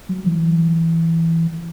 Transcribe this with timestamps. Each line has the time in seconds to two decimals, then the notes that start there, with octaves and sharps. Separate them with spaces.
0.09 F#3
0.26 E3